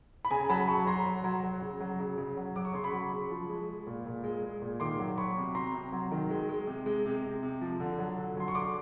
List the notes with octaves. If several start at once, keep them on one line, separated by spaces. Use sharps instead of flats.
B5
C#3 G#5 A#5
F#3 A5 B5
F#3 B5 C#6
F#3 A#5 C6
F#3
F#3
F#3
C#3
F#3
C#3
C#3
F#3
F#3 D6
C#6
C#3 C6
B5 C#6
F#3
C#3
F3
G#3
G#3
A#2
A#2
G#3
G#3
A#2
D#3 C6 D6
F#3
F#3 B5 C#6
C3
C3 A#5 C6
C3
F#3
D#3
G#3
G#3
C3
G#3
C3
C3
C3
F3
D3
F#3
D3
F#3 C6
C#6
D3 C6 D6